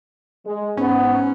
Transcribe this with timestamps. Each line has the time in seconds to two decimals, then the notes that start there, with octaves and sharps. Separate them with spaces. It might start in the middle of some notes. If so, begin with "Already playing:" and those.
0.46 G#3
0.77 G#2 B3 C#4